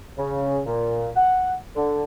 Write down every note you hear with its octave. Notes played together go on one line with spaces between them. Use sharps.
C#3
A#2
F#5
D3